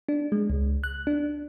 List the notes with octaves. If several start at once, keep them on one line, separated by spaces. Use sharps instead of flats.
D4
G#3
C#2
F#6
D4